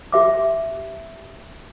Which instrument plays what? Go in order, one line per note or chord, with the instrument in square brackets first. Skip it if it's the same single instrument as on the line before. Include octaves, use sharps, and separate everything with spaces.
[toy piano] G4 E5 D6